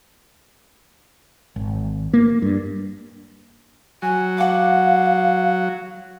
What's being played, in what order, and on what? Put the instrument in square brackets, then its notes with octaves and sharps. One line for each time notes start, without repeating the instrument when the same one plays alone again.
[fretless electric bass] G#1
A#3
G2
[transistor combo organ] F#3 [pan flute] G#5
[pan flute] F5 [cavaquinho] F#5 D6